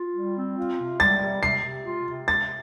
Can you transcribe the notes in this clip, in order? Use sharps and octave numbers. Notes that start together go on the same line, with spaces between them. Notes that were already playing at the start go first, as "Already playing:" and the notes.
Already playing: F4
G3
C4
F4
C3
G3 A6
C3
C3 C7
C3
F4
C3
C3 A6